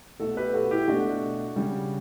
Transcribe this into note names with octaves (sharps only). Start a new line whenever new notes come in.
B2 A3 F#4 A4
G4 B4
F#4 A4
E4 G4
B2 A3 D4 F#4
C#3 G3